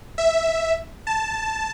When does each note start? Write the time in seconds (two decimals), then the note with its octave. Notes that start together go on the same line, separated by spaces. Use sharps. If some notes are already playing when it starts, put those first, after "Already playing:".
0.18 E5
1.07 A5